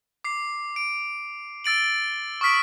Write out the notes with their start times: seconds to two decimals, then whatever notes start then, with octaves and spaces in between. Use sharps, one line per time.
0.24 D6 C7
0.76 D7
1.64 E6 A6 D7 F#7
2.41 C#6 D#6 F6 B6 D7